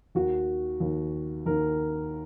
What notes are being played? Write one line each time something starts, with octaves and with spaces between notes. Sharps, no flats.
D#2 D#3 F#4
D#2 D#3
D#2 D#3 A#4